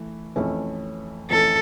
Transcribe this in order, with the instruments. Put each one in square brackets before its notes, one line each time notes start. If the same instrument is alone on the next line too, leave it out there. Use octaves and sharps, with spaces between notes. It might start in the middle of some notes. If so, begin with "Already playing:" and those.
Already playing: [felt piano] E3 A3
F2 E3 A3 C#4
[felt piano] F2 E3 A3 C#4 [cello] A4